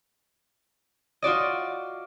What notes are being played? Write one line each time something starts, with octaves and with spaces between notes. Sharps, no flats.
F4 F#4 D5 D#5